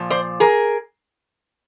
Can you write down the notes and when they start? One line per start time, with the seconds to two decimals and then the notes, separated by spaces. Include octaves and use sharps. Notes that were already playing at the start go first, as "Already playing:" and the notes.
Already playing: A#2 F3
0.10 C5 D5
0.40 G#4 A#4